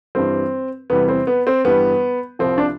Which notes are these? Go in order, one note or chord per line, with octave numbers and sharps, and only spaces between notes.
G2 E3 G3 C4
E2 C3 E3 G3 B3
C4
B3
C4
G2 E3 G3 B3
C2 C3 F3 C4
D4